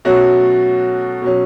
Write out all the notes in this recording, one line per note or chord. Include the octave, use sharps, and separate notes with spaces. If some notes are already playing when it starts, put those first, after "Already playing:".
B2 F#3 A3 C#4 F#4
B2 F#3 C#4